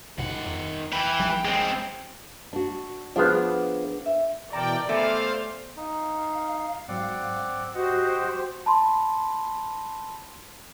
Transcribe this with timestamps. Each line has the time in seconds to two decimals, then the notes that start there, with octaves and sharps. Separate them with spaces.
0.18 A#1 G#2 B2 D#3 F#5
0.43 D#1 F2
0.93 E3 B4 G5
1.19 A#1 F3 G3
1.45 G#3 C4
2.53 D4 F#4
3.16 F3 B3 D4 G#4 F5
4.06 E5
4.53 B2 E3 A#4 D5 G5 A5 A#5
4.89 A3 B3 C5 F5 F#5 G#5
5.77 D#4 F5
6.88 G#2 F#3 C4 D5 F#5
7.75 F#4 G4 C5 D#5 F#5
8.66 A5 B5 C6